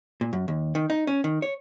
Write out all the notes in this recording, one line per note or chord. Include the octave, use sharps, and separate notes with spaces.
A#2
F#2
D#2
D#3
D#4
C#4
D#3
C#5